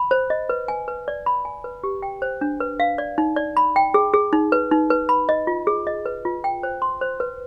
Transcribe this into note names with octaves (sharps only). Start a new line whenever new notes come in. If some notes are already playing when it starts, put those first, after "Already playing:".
Already playing: B5
C5
D#5
B4
G#5
B4
D5
B5
G#5
B4
G4
G5
C5
D4
B4
F5
D5
D#4
D5
B5
G5
G#4
G#4
D#4
B4
D#4
B4
B5
D#5
F4
G#4
D#5
B4
F4
G5
C5
C6
C5
B4